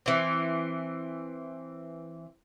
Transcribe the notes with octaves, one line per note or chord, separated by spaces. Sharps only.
E3 C4